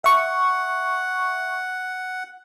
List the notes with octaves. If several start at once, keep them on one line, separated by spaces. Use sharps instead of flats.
E5 F#5 C#6